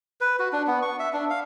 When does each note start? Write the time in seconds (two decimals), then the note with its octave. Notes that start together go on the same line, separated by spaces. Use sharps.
0.21 B4
0.39 F#4
0.53 D4
0.67 B3
0.82 C#6
0.99 E5
1.13 D4
1.30 F5